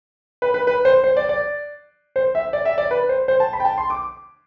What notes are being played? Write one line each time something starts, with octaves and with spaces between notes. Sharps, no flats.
B4
B4
B4
C5
C5
D5
D5
C5
E5
D5
E5
D5
B4
C5
C5
A5
B5
G5
A5
C6
D6